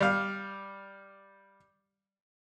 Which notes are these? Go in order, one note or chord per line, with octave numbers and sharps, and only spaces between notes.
G3 F5